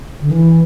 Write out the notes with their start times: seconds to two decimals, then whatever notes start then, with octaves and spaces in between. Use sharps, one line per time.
0.21 D3
0.31 E3